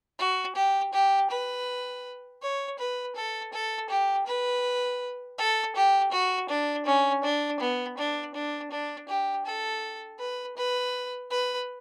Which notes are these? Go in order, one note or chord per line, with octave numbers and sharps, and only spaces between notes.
F#4
G4
G4
B4
C#5
B4
A4
A4
G4
B4
A4
G4
F#4
D4
C#4
D4
B3
D4
D4
D4
G4
A4
B4
B4
B4